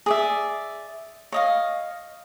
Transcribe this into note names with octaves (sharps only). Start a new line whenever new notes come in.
G#4 D5 E5
C#5 D#5 F5